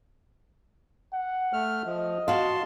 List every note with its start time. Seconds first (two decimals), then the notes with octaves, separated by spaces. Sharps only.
1.14 F#5
1.53 A3 F6
1.85 F3 D#5
2.28 F#4 F5 A5 C6